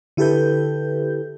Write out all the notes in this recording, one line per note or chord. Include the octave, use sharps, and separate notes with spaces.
D3 E4 G4 A4 B4 G6